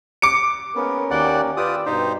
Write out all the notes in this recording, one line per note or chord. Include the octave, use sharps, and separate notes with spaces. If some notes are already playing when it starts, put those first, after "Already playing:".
D6 C#7 D7
G#2 A#3 B3 C#4 A#4
D#2 F#4 D5 F#5 G5
F4 G4 B4 D5 D#6 E6
G2 B2 D#4 G4 C5